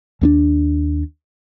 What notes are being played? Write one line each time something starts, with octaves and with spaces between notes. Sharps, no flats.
D#2 A#3 D4